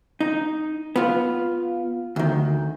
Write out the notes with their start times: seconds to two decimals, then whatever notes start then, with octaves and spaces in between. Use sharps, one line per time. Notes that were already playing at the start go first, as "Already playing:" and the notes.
0.21 D#4
0.96 B3 F4
2.16 D2 D#3